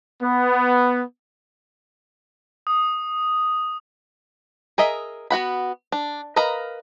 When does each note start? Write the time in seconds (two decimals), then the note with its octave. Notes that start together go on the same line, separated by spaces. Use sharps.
0.21 B3
2.67 D#6
4.78 G#4 A#4 D#5 E5
5.30 B3 F#4 F#5 B5
5.92 D4
6.36 A#4 B4 D#5 F5 A#5